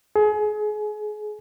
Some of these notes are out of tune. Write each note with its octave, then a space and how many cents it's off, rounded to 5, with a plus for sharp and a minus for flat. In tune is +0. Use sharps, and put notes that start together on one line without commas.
G#4 +30